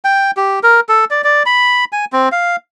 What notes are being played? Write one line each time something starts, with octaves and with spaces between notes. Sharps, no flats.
G5
G4
A#4
A4
D5
D5
B5
G#5
C4
F5